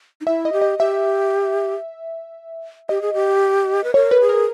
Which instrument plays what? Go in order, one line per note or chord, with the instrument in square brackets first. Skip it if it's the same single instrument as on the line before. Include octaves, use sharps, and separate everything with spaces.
[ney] D#4
[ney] E4 [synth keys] E5
[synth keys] D#5
[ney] G4
[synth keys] D#5
[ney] G4 [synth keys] E5
[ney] G4 [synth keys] D#5
[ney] G#4
G4
B4
[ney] A#4 [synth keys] C#5
[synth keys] B4
[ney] G#4
[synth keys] A#4